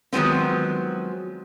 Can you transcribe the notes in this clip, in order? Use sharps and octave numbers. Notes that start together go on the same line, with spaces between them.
D#3 F3 F#3 G#3 B3 C4